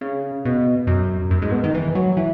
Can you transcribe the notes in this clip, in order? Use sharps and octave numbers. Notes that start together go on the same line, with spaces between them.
C#3
B2
F#2
F#2
G#2
B2
D#3
E3
F#3
E3